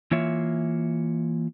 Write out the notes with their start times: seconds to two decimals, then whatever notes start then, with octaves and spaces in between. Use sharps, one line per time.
0.11 E3 A#3 F4 C#5 E5